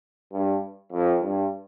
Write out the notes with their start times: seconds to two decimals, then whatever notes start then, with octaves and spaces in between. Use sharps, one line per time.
0.32 G2
0.92 F2
1.21 G2